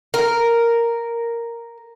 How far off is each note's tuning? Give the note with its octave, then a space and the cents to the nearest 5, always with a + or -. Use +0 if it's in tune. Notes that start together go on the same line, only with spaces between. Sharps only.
A#4 +0